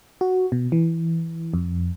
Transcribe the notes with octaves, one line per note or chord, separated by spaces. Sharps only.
F#4
B2
E3
F2